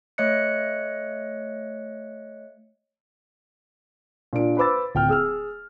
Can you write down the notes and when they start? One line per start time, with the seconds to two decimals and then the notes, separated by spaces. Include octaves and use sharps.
0.18 A3 C#5 D#5 F#6 C#7
4.33 A#2 D4 D7
4.57 B4 C5 B5 D6 E6 A6
4.95 D1 G5 F6
5.09 G#4 E6 F6